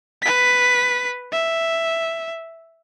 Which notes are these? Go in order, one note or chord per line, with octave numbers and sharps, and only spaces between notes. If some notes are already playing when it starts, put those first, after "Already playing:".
B4 B6
E5